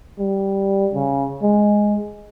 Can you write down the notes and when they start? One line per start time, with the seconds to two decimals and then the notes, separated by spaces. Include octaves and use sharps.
0.19 G3
0.94 C#3
1.42 G#3